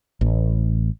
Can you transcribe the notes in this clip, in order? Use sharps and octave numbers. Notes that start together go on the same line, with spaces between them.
A1